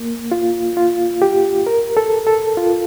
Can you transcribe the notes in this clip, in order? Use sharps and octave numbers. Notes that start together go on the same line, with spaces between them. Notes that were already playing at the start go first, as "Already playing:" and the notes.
Already playing: A#3
F4
F4
G4
A#4
A4
A4
F4